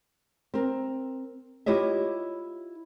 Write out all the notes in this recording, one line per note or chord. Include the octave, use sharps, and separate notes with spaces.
C4 A#4
E4 F4 G4 C#5 D#5 E5